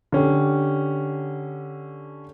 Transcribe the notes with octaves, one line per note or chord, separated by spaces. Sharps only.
D3 C#4 G4